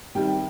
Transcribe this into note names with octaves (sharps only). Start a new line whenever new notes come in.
C3 D#3 G3 G5